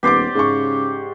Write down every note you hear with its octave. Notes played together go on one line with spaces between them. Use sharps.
D#1 B3 G4 C5 D5 D6
G#2 C#3 C#6